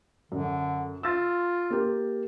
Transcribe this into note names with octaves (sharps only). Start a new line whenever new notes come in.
F#2 D3
F4 E6 A6
A#3 G4